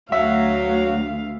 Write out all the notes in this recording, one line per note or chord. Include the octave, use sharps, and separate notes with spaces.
D2 F#3 E5 F5